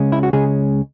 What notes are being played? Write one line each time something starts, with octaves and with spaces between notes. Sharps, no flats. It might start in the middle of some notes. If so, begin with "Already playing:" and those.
Already playing: C#2 C#3 G#3 C#4
E4
F#4
C#2 C#3 G#3 C#4 G#4